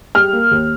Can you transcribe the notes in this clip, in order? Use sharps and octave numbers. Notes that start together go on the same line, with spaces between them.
G3 F6
A#3
D#2